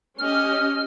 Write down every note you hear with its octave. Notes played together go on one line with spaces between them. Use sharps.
C#4 G4 D#5 F6